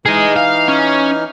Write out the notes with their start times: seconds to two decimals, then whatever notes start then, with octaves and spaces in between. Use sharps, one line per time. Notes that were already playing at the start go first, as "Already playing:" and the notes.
0.06 E3 D#4 G#4 D#5 F6
0.36 F5
0.68 C#4